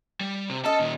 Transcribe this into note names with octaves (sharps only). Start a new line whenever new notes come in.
G3
C3
C#4 A4 D#5 A5
A#2 D#3